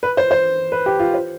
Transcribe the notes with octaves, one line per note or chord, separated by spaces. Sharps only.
B4
C5
C5
B4
G4
F4
C5